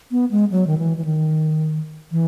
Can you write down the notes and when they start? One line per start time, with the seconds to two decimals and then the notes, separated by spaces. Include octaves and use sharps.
0.11 B3
0.31 G#3
0.51 F#3
0.67 D#3
0.78 E3
0.97 E3
1.05 D#3
2.11 E3